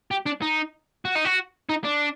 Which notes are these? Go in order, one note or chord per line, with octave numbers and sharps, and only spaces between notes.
G4
D4
D#4
F#4
D#4
F#4
D#4
D4